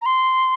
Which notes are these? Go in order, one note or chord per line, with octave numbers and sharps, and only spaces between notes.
A#5
C6